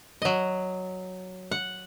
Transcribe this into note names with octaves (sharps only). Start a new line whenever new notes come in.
F#3 D#5
F#5